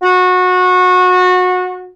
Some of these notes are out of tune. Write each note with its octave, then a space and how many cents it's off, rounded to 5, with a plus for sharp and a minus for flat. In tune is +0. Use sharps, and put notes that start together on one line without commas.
F#4 -25